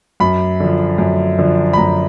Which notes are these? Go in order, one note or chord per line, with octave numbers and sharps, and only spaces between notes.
F#2 B5
D3 F3
F#2
D3 F3
B5
F#2 A#5